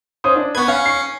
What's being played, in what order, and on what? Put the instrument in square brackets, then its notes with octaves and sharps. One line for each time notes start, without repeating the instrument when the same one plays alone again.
[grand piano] C#4 C5 D#6
D4
[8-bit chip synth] B3 G#6 [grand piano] B4 C#6
[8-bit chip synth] C#4 [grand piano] F5
[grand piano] C#6 C7